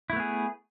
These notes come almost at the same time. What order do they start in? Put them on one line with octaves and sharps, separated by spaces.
E4 A3 B3 G#4